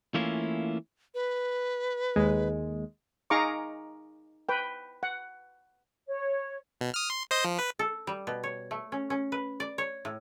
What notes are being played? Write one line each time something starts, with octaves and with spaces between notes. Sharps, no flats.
E3 A3 A#3 C#4 E4 F4
B4
D#2 G#3
D#4 G#4 F5 A#5 C#6 D6
B4 G5
F#5
C#5
B2
D#6 F6
C6
C5 D#5 D#6
F3
B4
A4
G3
B2
C#5
A3
C#4
C#4
B4
D5
C#5
A2